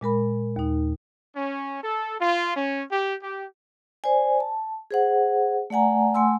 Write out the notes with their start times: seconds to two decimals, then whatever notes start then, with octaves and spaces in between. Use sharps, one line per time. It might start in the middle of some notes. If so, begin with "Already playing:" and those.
0.01 A#2 G#3 A#4 B5
0.56 D#2 D#4
1.35 C#4
1.83 A4
2.19 F4
2.55 C#4
2.90 G4
3.22 G4
4.04 C5 D5 G#5
4.40 A5
4.91 G#4 C5 F#5
5.70 A3 D5 F#5 G#5 A#5
6.14 A3 F#5 G#5 C6 E6